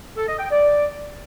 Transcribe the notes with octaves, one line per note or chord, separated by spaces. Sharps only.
A4
D#5
G5
D5